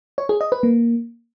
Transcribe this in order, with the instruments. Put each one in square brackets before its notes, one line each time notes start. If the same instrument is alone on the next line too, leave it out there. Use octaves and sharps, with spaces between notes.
[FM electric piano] C#5
G#4
D#5
B4
A#3